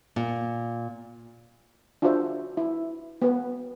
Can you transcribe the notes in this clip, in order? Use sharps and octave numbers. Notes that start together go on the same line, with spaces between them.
A#2
D4 F4 F#4 G#4 C5 E5
E4
B3 B4